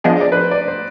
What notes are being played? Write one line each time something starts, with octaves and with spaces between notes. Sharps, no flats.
F3 B3 D4 G#4 D#5
D5
B4
C5
D5
C5